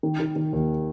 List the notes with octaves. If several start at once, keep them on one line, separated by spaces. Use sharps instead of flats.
D#3
D#3
D#3
D#2